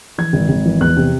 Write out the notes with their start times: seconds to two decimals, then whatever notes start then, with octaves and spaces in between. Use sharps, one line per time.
0.18 E3 G#6
0.33 G#1
0.49 G#1
0.65 E3
0.81 E2 F#6
0.97 C3